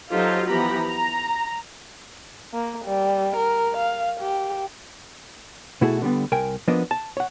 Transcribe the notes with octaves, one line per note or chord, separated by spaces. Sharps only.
F#3 D#4 F4 G4 A4 C5
E3 F3 B3 G4 A#5 B5
A#5
A#3
G3
A#4
F5
G4
B2 A3 E4 F#4 G#4 A4
D3 G3 B3
C2 A#4 G5 G#5
F3 A#3 B3 D4 D#5
A5
C#5 F#5